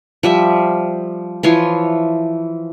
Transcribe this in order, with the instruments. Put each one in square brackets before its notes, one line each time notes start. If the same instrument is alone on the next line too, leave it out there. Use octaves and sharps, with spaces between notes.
[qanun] F3 G3 E5
E3 F3 C#5 C6